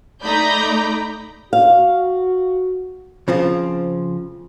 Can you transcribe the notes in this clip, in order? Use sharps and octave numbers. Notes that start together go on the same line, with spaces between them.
A3 D#4 D5 A#5 B5 G6
F#4 F5
C#3 F3 C4 F4